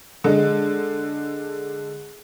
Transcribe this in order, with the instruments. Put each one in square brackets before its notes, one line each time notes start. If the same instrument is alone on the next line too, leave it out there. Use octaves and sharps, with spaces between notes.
[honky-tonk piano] D3 G#3